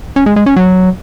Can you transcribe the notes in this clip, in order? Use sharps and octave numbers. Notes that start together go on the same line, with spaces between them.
C#4
G#3
G#3
C#4
F#3